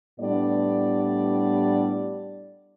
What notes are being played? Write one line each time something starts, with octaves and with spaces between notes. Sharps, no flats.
A2 G3 B3 D4 D5